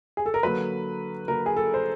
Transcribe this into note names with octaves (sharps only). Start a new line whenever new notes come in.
G#4
A4
A#4
D3 F#3 A#3 B4
D3 F#3 A#3 A#4
G#4
A4
C5